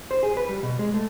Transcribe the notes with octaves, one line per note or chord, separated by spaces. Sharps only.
C5
G#4
B4
G3
B2
G#3
A3